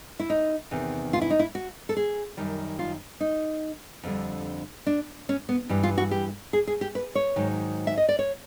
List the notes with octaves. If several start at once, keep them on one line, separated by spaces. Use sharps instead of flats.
E4
D#4
E2 C3 D#3
F4
E4
D#4
E4
F#4
A4
G#4
F#2 D#3 G3
F4
D#4
F2 D3 G3
D4
C#4
B3
G2 E3 G3
F4
F#4
G4
G#4
G#4
G4
B4
C#5
G#2 D#3 F#3
E5
D#5
D5
C#5